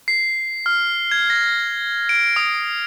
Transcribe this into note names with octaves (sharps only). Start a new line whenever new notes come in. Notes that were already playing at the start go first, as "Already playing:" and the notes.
C7
F6
G#6
A#6
D7
D#6